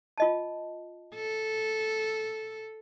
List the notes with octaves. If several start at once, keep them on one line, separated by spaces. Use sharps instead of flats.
F4 D#5 A5
A4